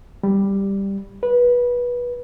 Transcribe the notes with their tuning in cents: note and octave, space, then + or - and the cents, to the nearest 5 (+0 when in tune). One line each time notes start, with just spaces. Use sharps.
G3 +5
B4 -20